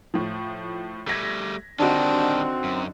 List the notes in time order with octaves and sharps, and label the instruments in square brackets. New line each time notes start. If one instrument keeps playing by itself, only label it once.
[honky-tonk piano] A2 F3
[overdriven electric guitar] G3 A3 [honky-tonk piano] G#6 A#6 B6
[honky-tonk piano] D3 D#4 F#4 [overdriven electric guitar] D#3 G3 [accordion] C4 [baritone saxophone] D4
[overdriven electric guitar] F#2